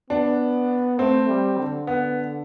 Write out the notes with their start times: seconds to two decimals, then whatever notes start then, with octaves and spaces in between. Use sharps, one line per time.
0.10 B3 D4
0.98 A3 C4
1.29 G3
1.58 D3
1.87 B3